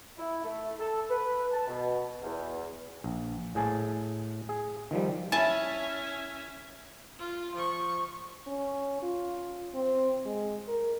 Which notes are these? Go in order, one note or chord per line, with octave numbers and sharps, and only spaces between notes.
E4
A3
A4
B4
A5
B2
E2
A#1
A2 G#4 G#5 A5
G#4
D#3 F3 G3
C#4 E4 E5 G#5 A5
F4
F3 C#6
C#4
F4
C4
G#3
A#4